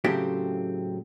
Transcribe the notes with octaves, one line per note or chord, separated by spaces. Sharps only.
A2 C#3 F#3 A3 C4 G4